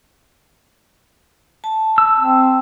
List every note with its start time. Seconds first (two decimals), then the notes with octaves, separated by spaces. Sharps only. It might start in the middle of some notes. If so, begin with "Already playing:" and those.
1.64 A5
1.98 E6
2.20 C4